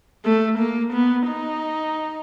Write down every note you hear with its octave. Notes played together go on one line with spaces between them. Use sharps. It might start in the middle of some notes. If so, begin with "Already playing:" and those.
A3
A#3
B3
D#4